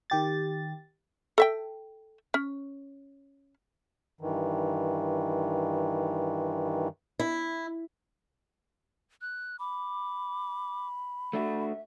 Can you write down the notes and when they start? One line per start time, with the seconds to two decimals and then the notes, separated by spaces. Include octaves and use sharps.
0.10 D#3 G4 A6
1.38 A4 E5 G5
2.34 C#4
4.21 G2 D#3 E3
7.19 E4
9.21 F#6
9.59 B5 D6
11.33 A3 D4 F#4 E5